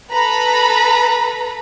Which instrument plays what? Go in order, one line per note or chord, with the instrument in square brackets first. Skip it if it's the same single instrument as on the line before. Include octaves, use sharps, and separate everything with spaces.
[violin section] A4 B4 A#5 B5